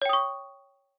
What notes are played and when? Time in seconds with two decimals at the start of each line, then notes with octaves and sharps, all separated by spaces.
0.02 C#5
0.05 G5
0.09 D#6
0.13 C#6